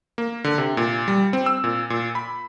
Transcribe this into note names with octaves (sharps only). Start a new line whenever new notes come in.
A#3
D3
C3
A#2
G3
C4
E6
A#2
A#2
B5